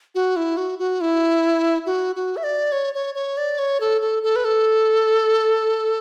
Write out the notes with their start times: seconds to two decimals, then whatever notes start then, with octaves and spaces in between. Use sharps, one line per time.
0.15 F#4
0.36 E4
0.57 F#4
0.79 F#4
1.01 E4
1.86 F#4
2.16 F#4
2.37 E5
2.44 D5
2.72 C#5
2.94 C#5
3.15 C#5
3.37 D5
3.59 C#5
3.81 A4
4.01 A4
4.23 A4
4.36 B4
4.45 A4